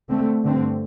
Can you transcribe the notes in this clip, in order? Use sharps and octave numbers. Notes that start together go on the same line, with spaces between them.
D3 A3 C4
G2 D3 A3 C4